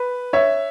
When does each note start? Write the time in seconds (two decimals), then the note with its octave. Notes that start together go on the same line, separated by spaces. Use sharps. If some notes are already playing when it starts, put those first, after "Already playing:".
Already playing: B4
0.33 C#5 E5